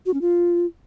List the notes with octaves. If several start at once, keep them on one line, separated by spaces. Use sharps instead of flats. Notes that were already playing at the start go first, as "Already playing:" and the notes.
F#4
C#4
F4